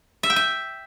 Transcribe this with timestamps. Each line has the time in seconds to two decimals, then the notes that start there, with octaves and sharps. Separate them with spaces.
0.23 E5
0.30 G5
0.36 E5